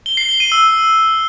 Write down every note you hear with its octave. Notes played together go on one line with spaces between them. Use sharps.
G7
C7
G7
D#7
E6